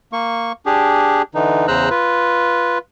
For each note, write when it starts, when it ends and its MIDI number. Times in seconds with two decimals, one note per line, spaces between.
0.13 0.52 58
0.13 0.52 85
0.66 1.22 62
0.66 1.22 67
0.66 1.22 68
1.35 1.67 50
1.35 1.67 52
1.35 1.67 63
1.68 1.89 40
1.68 1.89 49
1.68 1.89 72
1.68 1.89 82
1.68 1.89 88
1.68 1.89 90
1.90 2.78 65
1.90 2.78 71